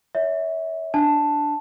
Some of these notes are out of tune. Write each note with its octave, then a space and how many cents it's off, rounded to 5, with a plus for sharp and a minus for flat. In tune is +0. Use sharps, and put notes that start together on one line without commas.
C#5 +25 E5 -20
D4 +0 A5 +0